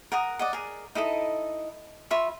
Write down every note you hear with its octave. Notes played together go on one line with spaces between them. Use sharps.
A#4 F#5 A#5 D#6
D5 D#5 F#5
G#4 A#4
D#4 E4 A4 D#5
F4 E5 B5 C#6